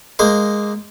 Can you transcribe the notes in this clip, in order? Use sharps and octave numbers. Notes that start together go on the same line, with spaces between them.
G#3 A#3 C5